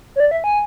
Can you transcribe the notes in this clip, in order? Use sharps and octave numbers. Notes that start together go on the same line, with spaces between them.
C#5
D5
E5
G#5